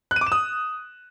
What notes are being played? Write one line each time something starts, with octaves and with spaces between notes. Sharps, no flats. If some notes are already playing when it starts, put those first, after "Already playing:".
F#6
D#7
D6
E7
D#6